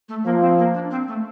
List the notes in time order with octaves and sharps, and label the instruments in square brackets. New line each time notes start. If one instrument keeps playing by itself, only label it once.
[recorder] A3
[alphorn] F3 [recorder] A#3
[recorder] C4
A#3
D4
C4
A3